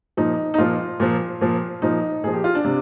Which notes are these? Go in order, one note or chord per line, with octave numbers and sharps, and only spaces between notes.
A#2 F3 D#4
D#4
A#2 F3 F4
A#2 F3
A#2 F3
A#2 F3 D#4
A#2 F3 G#4
G4
F4
D4
C3